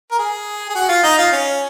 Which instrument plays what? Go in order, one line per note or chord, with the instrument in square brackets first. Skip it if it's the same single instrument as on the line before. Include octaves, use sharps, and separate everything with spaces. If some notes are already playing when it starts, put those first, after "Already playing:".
[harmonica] A#4
G#4
G#4
F#4
F4
D#4
F4
C#4